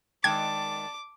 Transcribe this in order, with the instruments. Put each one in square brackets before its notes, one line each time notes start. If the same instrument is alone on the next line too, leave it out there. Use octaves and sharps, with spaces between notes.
[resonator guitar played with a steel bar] D#3 G#3 G5 [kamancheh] D5 A5 [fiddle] D6 [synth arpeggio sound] G#6